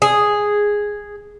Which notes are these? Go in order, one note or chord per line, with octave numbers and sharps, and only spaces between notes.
G#4